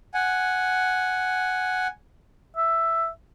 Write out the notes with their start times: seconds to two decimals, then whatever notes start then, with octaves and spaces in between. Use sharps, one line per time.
0.14 F#5 G#5
2.56 E5